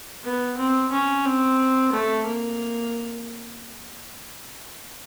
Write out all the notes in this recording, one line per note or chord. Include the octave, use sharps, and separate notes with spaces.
B3
C4
C#4
C4
A3
A#3